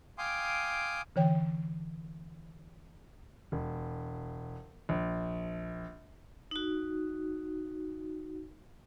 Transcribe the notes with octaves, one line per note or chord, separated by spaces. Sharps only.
F5 G5 G#5 C6 D6 D#6
D3 E3 C#5 G5
E1
A#1
D#4 F#4